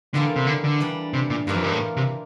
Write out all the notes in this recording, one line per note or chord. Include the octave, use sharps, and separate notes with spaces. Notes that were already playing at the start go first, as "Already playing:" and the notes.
D3 E3 G3 A#3 F4 A4
C3
D3
D3
E3 G3 D4
C3
A#2
G2 E3 A#3 D4 F4
F2
G2
A2
C3